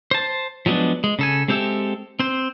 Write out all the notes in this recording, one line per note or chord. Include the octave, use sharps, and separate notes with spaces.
C5 A5
F3 F#3 G#3 B3 D4
G#3
C#3 A4 G#5
G#3 C4 G4 A4 E5
C4 C5